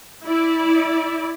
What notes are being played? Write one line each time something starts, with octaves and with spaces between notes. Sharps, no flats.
E4 D5